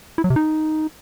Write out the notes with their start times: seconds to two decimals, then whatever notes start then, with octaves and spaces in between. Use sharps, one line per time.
0.18 E4
0.24 F#3
0.30 C3
0.36 D#4